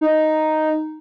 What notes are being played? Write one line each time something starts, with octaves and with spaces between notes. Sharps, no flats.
D#4